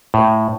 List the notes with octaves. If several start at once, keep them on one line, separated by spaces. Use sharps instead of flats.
A2